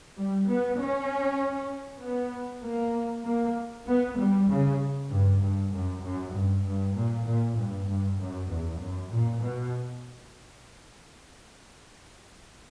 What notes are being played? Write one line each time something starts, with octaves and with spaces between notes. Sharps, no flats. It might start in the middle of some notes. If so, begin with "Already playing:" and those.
G3
B3
C#4
B3
A#3
A#3
B3
G3
C#3
G2
G2
F#2
F#2
G2
G2
A#2
A#2
G2
G2
F#2
E2
F#2
A#2
B2